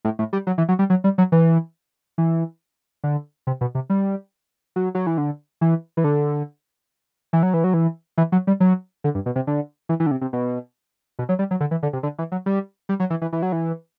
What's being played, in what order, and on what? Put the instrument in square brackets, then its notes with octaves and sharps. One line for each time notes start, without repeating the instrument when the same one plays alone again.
[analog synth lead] A2
A2
G3
F#3
E3
F#3
G3
F#3
G3
F#3
E3
E3
D3
C3
B2
C3
G3
F#3
F#3
E3
D3
E3
E3
D3
E3
F#3
E3
F#3
E3
E3
F#3
G3
F#3
D3
G2
B2
C3
D3
E3
E3
D3
C3
C3
B2
B2
F#3
G3
F#3
D3
E3
D3
C3
D3
E3
F#3
G3
G3
F#3
E3
E3
E3
F#3
E3